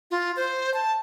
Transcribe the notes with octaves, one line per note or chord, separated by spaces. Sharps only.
F4
C5
A5